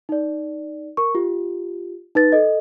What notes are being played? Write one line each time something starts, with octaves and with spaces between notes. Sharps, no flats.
D#4 D5
A#4 C#6
F4 G4
D#4 B4 A6
A4 D#5